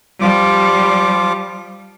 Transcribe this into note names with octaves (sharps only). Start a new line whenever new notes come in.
F3 G3 F4 D6